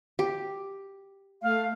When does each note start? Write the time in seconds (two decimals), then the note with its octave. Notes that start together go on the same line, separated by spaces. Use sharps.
0.19 G4
1.43 A3 F5